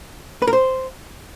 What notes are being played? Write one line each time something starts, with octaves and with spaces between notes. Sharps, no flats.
B4
A#4
C5